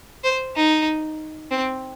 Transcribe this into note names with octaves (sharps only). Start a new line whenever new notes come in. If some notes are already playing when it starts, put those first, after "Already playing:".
C5
D#4
C4